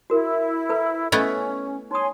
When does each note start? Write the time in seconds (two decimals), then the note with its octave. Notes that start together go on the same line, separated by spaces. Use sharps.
0.10 E4 F#4 A#4
0.69 A4 B4 A#5
1.12 A3 B3 C#4 E4 D#5
1.91 D#4 C#5 G#5 C6 D#6